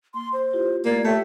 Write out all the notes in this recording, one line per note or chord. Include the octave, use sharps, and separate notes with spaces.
A#3 C6
C5
E4 F4 G4
A3 A#3 D5 G#6
A3 G4 C#5 E5 G5